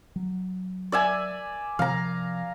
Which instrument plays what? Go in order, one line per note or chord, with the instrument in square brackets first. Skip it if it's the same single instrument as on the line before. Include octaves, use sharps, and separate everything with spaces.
[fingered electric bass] F#3
[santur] D5 E5 G#5
[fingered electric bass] C3 F3 [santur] F5 A#5